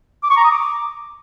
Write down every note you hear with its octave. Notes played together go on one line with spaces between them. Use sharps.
D6
C#6
A#5
D#6
D6